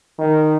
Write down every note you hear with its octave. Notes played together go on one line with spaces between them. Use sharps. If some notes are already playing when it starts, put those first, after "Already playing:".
D#3